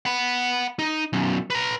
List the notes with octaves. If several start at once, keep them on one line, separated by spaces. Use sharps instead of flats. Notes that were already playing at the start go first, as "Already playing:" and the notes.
F#5 B5
D#4
B1 F#2
B4 A#5